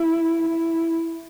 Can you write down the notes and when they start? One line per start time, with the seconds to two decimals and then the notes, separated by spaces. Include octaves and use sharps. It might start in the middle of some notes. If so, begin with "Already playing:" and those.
Already playing: E4
0.49 E4